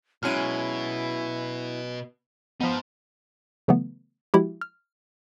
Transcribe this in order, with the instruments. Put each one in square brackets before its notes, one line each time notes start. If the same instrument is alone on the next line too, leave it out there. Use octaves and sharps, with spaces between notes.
[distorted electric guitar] B2 [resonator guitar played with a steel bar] F#3 G#3 C#4 [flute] E4 [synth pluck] F6 D#7
[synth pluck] F3 B3 [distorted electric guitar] D#4 C5
[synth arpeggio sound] C#3 E3 F#3 A3 B3
F3 G#3 E4 F#4 G4
F6